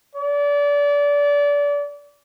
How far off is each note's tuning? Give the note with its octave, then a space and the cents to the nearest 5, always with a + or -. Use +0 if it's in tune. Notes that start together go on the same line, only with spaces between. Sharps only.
D5 -30